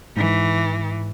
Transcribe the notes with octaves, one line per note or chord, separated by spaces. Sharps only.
G#2 E3